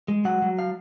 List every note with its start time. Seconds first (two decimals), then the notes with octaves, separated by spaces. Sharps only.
0.08 G#3
0.25 F#3 F#5
0.42 F#3
0.59 F5